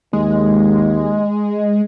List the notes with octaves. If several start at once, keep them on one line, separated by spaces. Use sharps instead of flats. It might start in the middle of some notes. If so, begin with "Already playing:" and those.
D#2 G#3